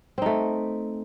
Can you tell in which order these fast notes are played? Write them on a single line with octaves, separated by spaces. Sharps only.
C4 D#4 A3